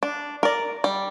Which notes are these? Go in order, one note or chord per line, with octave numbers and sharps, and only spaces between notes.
D4
A#4 D5
G3